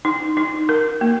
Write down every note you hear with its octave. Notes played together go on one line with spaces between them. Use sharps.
D#4
D#4
A#4
A#3